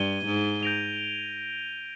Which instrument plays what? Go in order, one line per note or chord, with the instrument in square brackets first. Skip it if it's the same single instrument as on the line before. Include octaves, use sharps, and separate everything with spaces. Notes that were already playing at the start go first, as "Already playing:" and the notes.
Already playing: [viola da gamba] G2 [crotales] G#6 D#7 G7
[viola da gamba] G#2
[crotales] G6 A#6 D7 F7